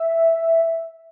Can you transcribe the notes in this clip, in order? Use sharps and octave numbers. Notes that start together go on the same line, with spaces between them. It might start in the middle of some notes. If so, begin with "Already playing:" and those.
Already playing: E5